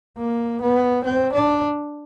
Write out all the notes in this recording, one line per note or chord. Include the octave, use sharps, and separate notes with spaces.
A#3
B3
C4
D4